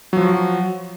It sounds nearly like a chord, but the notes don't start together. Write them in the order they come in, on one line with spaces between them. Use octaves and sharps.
F#3 F3 F#4